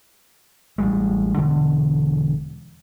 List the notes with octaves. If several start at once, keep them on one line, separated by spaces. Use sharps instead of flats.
A1 G3 G#3
E1 D3